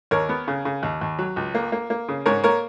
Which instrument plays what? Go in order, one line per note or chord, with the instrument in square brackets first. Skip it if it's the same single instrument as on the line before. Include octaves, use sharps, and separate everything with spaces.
[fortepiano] D#2 A#4 C#5
B3
C#3
C#3
D#2
D#2
F#3
C#2
A#3
A#3
A#3
C#3
G#2 A#4 C#5
A#3 A#4 C#5